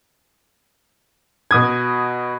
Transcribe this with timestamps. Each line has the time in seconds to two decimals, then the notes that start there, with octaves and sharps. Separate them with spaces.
1.51 B2 D#6 G#6